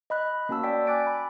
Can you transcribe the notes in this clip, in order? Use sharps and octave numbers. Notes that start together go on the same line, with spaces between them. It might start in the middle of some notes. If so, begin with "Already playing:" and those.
D#5 B5 F#6
A#3 C#4 F#4 A5 E6
D5 G5 B6
G#5 D6 F#6 A6 D7
B5